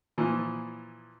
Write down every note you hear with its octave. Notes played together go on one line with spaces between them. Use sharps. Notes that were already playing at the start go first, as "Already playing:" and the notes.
A#2 E3 F3